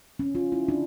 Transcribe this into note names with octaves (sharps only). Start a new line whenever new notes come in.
C#4
F4
E4
D4